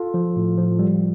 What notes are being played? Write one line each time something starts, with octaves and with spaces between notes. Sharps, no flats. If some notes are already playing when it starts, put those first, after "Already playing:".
Already playing: F4 A4
F3
A2
F3
G3